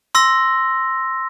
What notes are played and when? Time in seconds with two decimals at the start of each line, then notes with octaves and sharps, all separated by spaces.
0.15 C6 E6 A#6